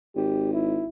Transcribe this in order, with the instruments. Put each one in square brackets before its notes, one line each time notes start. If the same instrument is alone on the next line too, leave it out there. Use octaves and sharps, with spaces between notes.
[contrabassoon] G#1 [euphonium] G4
[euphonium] E4